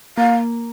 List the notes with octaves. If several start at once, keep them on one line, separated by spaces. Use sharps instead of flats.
A#3 F5